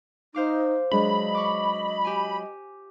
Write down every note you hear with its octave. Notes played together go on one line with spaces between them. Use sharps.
D#4 C5 F5 D6
F#3 G#3 D4 D#5 B5
C#6 D6
G4 G#5